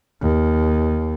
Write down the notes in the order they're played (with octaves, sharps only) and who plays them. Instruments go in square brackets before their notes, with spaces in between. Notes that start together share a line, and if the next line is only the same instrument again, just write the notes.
[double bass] D#2